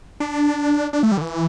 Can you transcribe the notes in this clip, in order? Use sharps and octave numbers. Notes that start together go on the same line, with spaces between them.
D4
D4
A3
G3
D3
E3